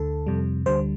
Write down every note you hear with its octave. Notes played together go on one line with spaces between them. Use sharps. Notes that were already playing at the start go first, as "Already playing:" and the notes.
Already playing: D2 D3 A4
F2 C3 G3
D2 D3 G3 C5